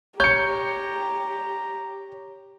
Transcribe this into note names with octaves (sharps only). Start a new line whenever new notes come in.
G4 C#5 A#5 G6 C#7